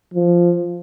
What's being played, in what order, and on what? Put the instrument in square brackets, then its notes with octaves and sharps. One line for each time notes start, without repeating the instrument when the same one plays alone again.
[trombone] F3